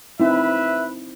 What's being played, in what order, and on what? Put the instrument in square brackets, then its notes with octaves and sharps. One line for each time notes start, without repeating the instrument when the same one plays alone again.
[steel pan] C4 D#4 E4 [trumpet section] B4 E5